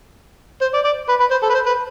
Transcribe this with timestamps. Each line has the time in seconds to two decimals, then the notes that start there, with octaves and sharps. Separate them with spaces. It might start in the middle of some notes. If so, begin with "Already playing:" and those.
0.61 C5
0.74 D5
0.84 D5
1.09 B4
1.20 B4
1.31 C5
1.43 A4
1.50 B4
1.54 C5
1.66 B4